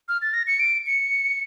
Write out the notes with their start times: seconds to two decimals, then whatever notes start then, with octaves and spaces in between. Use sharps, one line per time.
0.09 F6
0.22 A6
0.34 A#6
0.47 C#7
0.60 D7
0.87 C#7